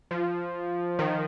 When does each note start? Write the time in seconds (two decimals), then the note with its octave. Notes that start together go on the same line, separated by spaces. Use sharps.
0.11 F3
0.99 D#3